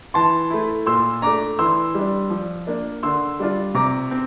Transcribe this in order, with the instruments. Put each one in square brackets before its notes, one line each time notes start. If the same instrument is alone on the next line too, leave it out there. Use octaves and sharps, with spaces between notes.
[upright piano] E3 A5 C6
A3 E4
A#2 C6 E6
A3 D4 A#5 D6
E3 C6 E6
G3 D4
F3
A#3 D4
D3 C6 E6
G3 D4 F4
C3 A#5 D6
C4